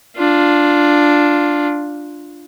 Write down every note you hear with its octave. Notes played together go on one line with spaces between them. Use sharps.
D4 F4